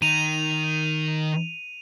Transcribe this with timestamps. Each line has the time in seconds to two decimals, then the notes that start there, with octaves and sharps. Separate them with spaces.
0.02 D#3 D#7 F7